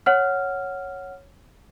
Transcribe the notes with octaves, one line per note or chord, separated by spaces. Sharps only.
C#5 F#5 F6